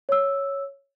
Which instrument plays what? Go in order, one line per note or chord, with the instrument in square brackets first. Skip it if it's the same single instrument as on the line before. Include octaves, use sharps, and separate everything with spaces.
[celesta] C#5 E6